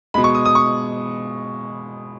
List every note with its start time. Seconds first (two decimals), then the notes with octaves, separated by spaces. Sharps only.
0.14 B2 G#3 B5
0.24 C#6
0.35 D#6
0.45 D#6
0.55 C#6